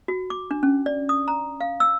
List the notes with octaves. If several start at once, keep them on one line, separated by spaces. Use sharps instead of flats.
F#4
D6
D4
C#4
D5
D#6
A#5
F5
E6